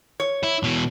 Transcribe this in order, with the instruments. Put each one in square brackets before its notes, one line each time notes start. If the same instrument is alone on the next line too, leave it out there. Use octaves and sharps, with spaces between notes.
[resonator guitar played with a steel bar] C#5
[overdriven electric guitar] E4
B2 E3